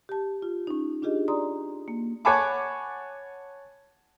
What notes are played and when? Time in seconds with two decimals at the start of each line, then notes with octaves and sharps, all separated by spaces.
0.09 G4 A5
0.42 F4
0.67 C#4 D#4
1.02 D4 F4 G4 G#4 D#5
1.28 D5 A#5 C6 D#6
1.88 A#3
2.25 C#5 F#5 G#5 A5 B5 D6